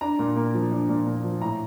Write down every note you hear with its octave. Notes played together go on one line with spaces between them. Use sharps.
D4 A#5
A#2
A#3
F3
D4
A#2
A#3
F3
A2 A#5